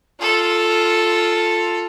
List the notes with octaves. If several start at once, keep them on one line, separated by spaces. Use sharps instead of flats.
F4 A4